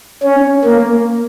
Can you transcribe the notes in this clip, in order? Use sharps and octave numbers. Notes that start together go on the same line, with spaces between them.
C#4
A#3